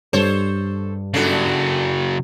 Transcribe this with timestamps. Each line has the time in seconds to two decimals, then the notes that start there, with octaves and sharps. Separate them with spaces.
0.13 G2 A4 C5 C#5
1.14 C#3 F#3 A3 D4 A4